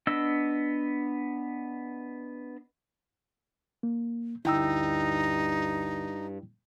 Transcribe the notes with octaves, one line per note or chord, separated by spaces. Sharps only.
B3 D4 D#5 E6
A#3
D2 G2 D#4 E4 G5 E6